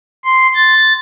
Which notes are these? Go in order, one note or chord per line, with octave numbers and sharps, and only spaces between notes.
C6
A6